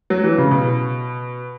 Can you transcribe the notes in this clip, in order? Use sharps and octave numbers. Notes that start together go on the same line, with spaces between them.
F#3
E3
C#3
B2